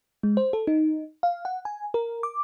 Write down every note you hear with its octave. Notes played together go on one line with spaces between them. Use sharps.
G#3
C5
A4
D#4
F5
F#5
G#5
A#4
D6